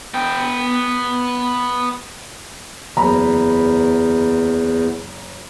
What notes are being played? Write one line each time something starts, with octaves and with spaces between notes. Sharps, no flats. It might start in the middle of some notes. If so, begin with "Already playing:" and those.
B3 G5
F#1 E2 A#5 B5